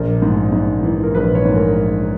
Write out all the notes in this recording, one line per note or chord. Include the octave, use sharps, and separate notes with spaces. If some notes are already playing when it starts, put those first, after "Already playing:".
Already playing: A#1 A#4
G#2
G#2
E3
A#4
A#1 B4
C#5
G#2
A#4